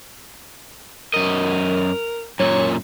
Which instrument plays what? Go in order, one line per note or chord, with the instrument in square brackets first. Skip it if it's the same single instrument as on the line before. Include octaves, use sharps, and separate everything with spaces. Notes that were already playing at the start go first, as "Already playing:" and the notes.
[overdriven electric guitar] F#2 D#5 [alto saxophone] A#4
[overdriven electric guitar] F#2 A#2 [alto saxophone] C#5